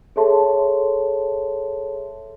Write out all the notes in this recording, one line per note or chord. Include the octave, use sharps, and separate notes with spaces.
G#4 A4 C#5 E5 A5 C6